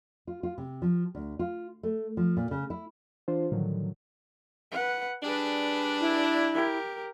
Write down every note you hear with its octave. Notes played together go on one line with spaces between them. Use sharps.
F4
F4
C3
F3
D2
F4
A3
F3
A#2
C#3
E4
E3 D4 F4 C5
A2 D3 D#3 F3 F#3
B4 F#5
G3 D4 G#4 B4
E4
G4 A#4